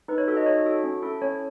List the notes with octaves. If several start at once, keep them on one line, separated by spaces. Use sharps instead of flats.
D#4 B4
C#5
F#4 A4
D#5
D#4 C#5
F#4 A4
C#4
E4 A4
C#4 C#5